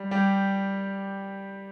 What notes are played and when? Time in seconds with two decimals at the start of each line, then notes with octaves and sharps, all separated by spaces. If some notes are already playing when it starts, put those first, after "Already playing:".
Already playing: G3
0.11 G3 G4